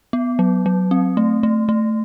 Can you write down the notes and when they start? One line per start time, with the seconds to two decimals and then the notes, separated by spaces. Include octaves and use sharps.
0.13 B3
0.39 F#3
0.66 F#3
0.91 C4
1.17 A3
1.43 A3
1.69 A3